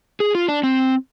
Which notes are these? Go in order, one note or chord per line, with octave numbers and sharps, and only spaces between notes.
G#4
F4
D4
C4